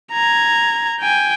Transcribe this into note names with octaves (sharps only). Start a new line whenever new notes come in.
A#5 G#6
G5 G#5